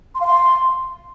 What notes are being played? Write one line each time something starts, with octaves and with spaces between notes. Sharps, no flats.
C6
F5
C6